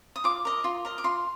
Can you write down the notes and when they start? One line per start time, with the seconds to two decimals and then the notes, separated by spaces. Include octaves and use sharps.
0.16 D#6
0.24 F4 D6
0.45 A#4 D#5
0.64 F4
0.85 A#4 D#5
0.98 D6
1.04 F4 C6